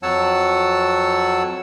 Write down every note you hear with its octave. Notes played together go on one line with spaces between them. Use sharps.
F2 F#3 C#5 F#5 A5 E6